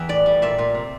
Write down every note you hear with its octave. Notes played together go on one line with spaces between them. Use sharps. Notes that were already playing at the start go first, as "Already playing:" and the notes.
Already playing: E2 E3 E5 G5
A2 D5
G3
A#2 E5
A#2
C3